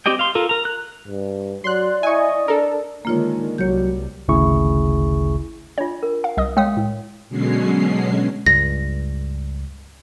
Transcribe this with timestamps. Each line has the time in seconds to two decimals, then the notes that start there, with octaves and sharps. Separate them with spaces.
0.06 C4 G4 D5 D#5 G5
0.19 F5 C6
0.35 F4 A4 A#4
0.49 A#4 A#5
0.65 F#6
1.08 G2
1.64 F#3 D5 C6 F#6
2.03 E4 D#5 G#5 C#6
2.48 D4 A4 A#4
3.05 D3 D#3 G#3 A#3 F4 C#5
3.58 C2 F#3 G3 C#5 G6
4.28 G#1 D2 C#3 E4 G#4 C#6
5.78 D4 F4 C#5
6.03 A#4
6.24 F5
6.37 C2 D#5 D#6
6.57 G#3 C#5 F5 G5 D#6
6.77 A2
7.29 B2 D3 F#3 G#3 C#4 C7
8.46 C#2 G2 A#6